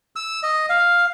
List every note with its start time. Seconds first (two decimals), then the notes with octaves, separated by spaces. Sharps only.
0.16 E6
0.43 D#5
0.69 F5